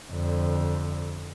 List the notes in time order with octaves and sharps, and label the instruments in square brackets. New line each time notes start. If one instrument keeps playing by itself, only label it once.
[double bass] F2 D3